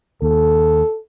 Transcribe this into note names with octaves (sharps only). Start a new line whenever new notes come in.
D#2 A4